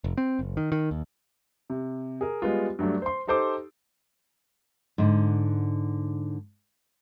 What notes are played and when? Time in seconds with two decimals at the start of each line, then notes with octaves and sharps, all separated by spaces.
0.04 F1
0.18 C4
0.39 F#1
0.57 D#3
0.72 D#3
0.91 D#2
1.70 C3
2.21 G#4 A#4
2.42 G3 G#3 B3 F4
2.79 G2 F#3 A3 D4
3.02 C5 C6
3.27 D#4 G4 A4 C5 C6 D6
4.98 G#2 D3